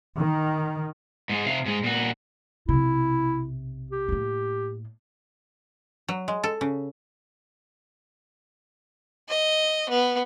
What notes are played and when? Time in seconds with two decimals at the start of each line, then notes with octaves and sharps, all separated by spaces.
0.17 D#3
1.29 G#2 G#3
1.46 C3 F5
1.66 G#2 G#3
1.84 A#2 F#4
2.69 B1 C3 E4
3.91 G4
4.08 A2 A#3
6.08 F#3
6.28 G#3
6.44 A4
6.61 C#3
9.29 D#5
9.89 B3